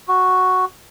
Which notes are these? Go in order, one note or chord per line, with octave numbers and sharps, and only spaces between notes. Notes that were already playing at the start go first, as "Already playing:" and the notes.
F#4